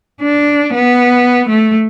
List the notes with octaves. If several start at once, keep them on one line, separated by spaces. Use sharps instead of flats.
D4
B3
A3